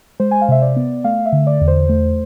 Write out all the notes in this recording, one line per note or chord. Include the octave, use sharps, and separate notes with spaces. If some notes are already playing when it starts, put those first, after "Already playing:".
G#3 C5
G#5
F5
C3 E5
D5
B3
A3 F5
E5
D3
D5
E2
C5
A3